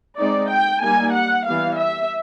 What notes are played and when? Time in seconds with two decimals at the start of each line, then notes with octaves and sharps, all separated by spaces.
0.19 G#3 C4 D#4 D5
0.50 G5
0.83 G3 A#3 D#4 G#5
1.14 F#5
1.47 E3 G3 B3 F5
1.78 E5